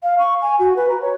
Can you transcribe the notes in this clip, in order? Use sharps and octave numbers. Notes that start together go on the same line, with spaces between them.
F5
C#6
G#5
F#4
B4
A#5
C#5